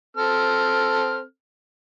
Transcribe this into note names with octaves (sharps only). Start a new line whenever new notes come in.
C4 A4 F6